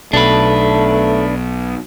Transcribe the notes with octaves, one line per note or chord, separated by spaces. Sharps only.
B1 B2 A3 D4 B4